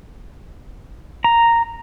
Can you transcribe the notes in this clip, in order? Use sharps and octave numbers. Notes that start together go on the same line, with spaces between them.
A#5